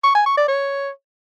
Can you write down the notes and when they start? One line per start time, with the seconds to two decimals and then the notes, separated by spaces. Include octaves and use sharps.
0.04 C#6
0.15 G#5
0.26 C#6
0.37 D5
0.48 C#5